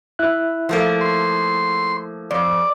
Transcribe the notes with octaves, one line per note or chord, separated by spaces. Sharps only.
E4 E5 F#6
F3 A3 A#3
C6
F2 D5